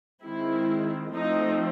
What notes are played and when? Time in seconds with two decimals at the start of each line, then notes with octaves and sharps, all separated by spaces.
0.23 D#3 G#3 C4 E4
1.14 F3 A3 C4 D#4